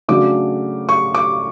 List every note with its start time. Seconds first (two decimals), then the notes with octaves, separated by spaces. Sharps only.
0.08 C#3 F#3 A3 D4 D6
0.89 C#6
1.14 D6